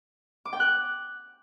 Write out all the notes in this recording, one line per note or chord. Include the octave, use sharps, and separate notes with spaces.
D6
G5
F#6